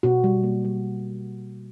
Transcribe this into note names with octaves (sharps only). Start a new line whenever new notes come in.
B2 F#4
G3
A#3
G3